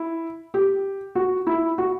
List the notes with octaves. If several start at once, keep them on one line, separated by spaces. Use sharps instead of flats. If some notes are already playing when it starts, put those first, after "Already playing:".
Already playing: E4
G4
F#4
E4
F#4